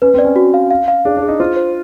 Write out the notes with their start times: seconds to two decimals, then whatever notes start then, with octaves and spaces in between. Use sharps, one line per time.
0.02 C#4 B4
0.14 C4
0.18 D5
0.25 C#4
0.36 F#4
0.54 F5
0.71 F5
0.88 F5
1.05 D4 G#4
1.17 D4
1.22 G#4
1.28 D#4
1.39 F4 C5
1.56 C5